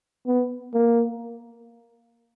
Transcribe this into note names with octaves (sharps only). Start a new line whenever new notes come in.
B3
A#3